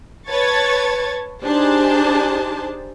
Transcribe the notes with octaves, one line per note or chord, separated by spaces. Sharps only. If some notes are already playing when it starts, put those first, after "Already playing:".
B4 C#5 A5 C#6 G#6 A6
D4 D#4 G4 G#4 C5 A5